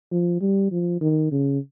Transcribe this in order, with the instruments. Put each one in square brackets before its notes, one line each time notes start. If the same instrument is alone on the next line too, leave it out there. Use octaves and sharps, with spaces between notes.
[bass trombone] F3
G3
F3
D#3
C#3